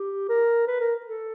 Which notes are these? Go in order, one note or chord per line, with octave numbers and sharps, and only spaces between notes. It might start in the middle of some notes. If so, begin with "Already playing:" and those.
Already playing: G4
A#4
B4
A#4
A4